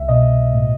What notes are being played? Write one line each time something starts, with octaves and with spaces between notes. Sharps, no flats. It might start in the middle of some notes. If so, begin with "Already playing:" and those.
Already playing: C2 E5
B2 D#5
A2